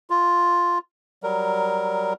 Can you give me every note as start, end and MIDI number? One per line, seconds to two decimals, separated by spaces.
0.10 0.79 65
1.23 2.13 54
1.23 2.13 55
1.23 2.13 70